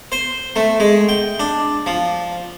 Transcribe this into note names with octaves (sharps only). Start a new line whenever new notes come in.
C5
A3
G#3
G5
D4
F3